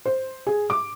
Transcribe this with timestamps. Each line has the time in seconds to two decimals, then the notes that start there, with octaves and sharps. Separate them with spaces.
0.05 C5
0.47 G#4
0.70 D6